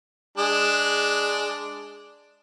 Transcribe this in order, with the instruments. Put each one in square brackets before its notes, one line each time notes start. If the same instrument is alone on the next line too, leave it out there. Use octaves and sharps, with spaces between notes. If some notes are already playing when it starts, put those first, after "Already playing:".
[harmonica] G#3 D4